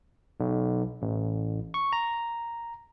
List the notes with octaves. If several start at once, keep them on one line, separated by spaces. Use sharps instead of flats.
B1
A1
C#6
A#5